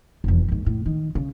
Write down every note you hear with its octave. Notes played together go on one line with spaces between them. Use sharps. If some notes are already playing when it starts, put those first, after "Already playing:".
F1 E2
D#2 G#2
A2
D#3
C#3